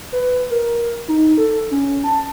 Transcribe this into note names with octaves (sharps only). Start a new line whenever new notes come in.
B4
A#4
D#4
A4
C#4
A5